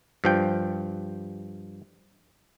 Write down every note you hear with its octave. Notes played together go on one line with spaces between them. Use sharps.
G2 F3 G5